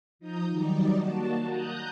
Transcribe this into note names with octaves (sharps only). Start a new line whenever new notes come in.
F3 D#4 A#5 D#6 G6
D#3 F#3 G3 D#4 D5
A#3 F#4 A5
A#5 D#6 F#6 G6